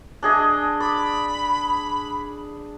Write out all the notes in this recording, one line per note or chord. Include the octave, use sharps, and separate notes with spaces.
D4 G#4 D#5
D5 B5